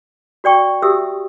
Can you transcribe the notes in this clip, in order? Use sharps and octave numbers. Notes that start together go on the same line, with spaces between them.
F#4 D5 G5 C#6
F#4 G4 E5 D#6 E6